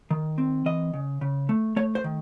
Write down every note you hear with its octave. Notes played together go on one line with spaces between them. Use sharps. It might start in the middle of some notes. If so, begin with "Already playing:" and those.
D#3
C4
E3 D#5
C#3
C#3
A3
A3 C#5
C5
D#3